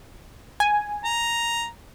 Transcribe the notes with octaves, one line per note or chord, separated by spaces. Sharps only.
G#5
A#5